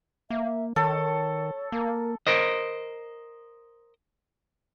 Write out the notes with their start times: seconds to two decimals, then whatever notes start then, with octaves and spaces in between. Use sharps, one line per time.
0.30 A#3 E5
0.76 D#3 A4 C#5
1.72 A#3 A#4
2.27 A#4 C5 D#5